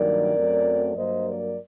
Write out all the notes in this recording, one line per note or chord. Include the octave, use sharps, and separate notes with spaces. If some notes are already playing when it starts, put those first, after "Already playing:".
Already playing: G2 D#3 F#3 A#3 A#4 D5
F#2 F#3 A3 C4
G2 F#3 A#3 C5 D#5
A#4 D5